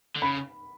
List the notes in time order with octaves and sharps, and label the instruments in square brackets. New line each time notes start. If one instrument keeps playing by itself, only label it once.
[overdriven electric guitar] D3
[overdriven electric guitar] C#3 [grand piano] B5